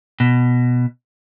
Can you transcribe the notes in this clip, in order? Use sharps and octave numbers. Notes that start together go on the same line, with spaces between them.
B2